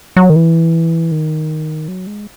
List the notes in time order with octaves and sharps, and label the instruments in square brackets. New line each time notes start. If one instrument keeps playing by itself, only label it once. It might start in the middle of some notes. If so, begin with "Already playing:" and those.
[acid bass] F#3
D#3
E3
D#3
F#3
G#3